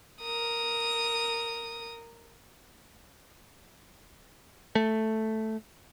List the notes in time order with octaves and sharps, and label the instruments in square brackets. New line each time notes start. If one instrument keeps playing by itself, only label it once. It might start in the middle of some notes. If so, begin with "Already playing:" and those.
[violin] A#4 D#6
[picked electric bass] A3